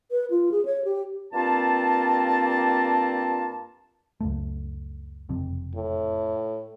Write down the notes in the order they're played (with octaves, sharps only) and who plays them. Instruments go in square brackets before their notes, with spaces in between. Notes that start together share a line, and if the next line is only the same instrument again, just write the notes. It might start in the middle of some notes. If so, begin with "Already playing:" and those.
[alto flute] B4
F4
G#4
C#5
G4
[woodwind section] G2 A#3 C4 F4 A5
[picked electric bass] C#2 F#2 A3
F#1 F2 C3
[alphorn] A2